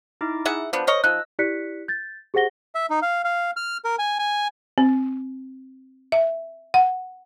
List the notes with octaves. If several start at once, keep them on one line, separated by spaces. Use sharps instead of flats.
D#4 E4 D6
G#4 E5 F#5
F3 B3 D4 C5
A#4 C#5 D#5
F3 D#4 D#5 E6 F#6
E4 G4 D5 F#6 B6 C#7
G6 A6
G4 G#4 C5 F#5 A#6 G7
E5
D#4
F5
F5
F6
A#4
G#5
G#5
C4
E5
F#5